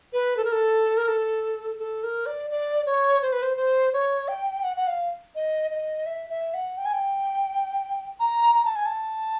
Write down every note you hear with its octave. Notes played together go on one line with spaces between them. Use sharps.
B4
A4
A#4
A4
A#4
A4
A4
A#4
D5
D5
C#5
C5
B4
C5
C5
C#5
G5
F#5
F#5
F5
D#5
D#5
E5
E5
F#5
G5
G#5
G5
A#5
A#5
A5
G#5
A5